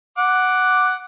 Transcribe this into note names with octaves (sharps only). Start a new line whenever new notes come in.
F#5 D6